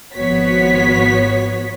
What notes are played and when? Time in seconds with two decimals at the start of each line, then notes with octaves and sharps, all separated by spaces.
0.15 G#1 F3 B3 F#4 C#5 B6